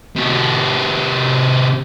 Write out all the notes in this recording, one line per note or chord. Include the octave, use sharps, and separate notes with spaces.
C3 F#4